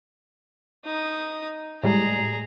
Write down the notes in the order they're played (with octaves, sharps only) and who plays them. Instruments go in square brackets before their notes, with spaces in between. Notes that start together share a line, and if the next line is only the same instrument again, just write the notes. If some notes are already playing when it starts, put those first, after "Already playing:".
[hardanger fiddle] D#4 D#6
[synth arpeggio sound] A2 G3 G#3 [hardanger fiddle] G#4 A#5